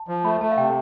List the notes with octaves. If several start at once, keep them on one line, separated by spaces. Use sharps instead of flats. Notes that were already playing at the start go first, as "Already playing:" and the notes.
Already playing: A5
F3
A3 B5
A3 A5
F5
C3 G5